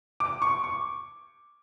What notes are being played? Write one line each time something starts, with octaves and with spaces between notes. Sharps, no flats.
D6
C#6
C#6